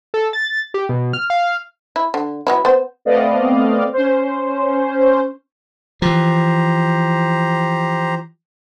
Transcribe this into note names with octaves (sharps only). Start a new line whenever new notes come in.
A4
A6
G4
B2
F6
F5
E4
D3
F#3 B3 E4
B3 C5
A3 B3 C4 D5 D#5 F5
C#4 C5
E3 F3 G4 C5 A#5